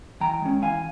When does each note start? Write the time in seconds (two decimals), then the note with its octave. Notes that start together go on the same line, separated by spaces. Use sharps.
0.20 E3 G5 A#5
0.42 G#3 C#4
0.62 E3 F5 G#5